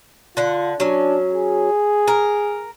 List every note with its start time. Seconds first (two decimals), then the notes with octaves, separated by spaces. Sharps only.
0.37 D3 F4 F#5
0.80 F#3 C#4 D4
1.33 G#4
2.08 A#4